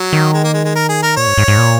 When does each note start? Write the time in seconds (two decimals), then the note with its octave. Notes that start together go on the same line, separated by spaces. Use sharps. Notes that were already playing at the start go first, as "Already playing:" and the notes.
Already playing: F#3
0.13 D#3
0.33 G#3
0.44 A#3
0.54 G#3
0.65 G#3
0.76 A#4
0.89 G#4
1.03 A#4
1.17 A#2 C#5
1.27 G#2
1.38 G#2
1.48 G#2
1.58 A#2